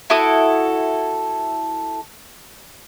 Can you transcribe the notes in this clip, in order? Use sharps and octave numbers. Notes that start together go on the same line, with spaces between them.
E4 F#4 A4 D#6